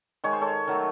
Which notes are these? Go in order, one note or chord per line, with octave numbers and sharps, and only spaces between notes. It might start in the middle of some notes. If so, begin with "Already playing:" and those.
D#3 G#3 C#5
C5
A4 C#5
D#3 F#3 A3